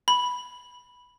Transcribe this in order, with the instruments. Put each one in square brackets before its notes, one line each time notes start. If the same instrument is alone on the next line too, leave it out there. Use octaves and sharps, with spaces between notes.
[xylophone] B5